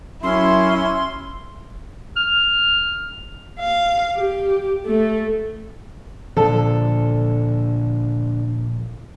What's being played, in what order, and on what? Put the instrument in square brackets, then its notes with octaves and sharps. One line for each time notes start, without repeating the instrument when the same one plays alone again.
[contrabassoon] F#2 [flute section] C#4 E6 [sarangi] E4 [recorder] C6
[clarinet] F6
[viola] F5
G4
A3
[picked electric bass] A#2 F3 [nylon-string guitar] D3 [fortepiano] A4